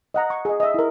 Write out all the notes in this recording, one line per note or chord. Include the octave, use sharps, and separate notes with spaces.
D#5 F#5 A#5
C#6
G#4 D#5
D#5 E5
E4 A#4